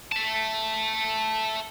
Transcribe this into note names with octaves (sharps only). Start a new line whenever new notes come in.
E5 A5